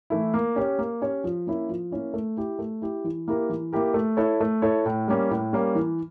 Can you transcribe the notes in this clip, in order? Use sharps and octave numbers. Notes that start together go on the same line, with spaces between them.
E3 A3 E4
A#3
C#4 G4 C#5
A#3
C#4 G4 C#5
F3
A#3 C#4 E4
F3
A#3 C#4 E4
A3
E4 G4
A3
E4 G4
E3
A#3 E4 G4 A#4
E3
A#3 E4 G4 A#4
A3
E4 A4 C#5
A3
E4 A4 C#5
A2
G3 A#3 C#4
A2
G3 A#3 C#4
E3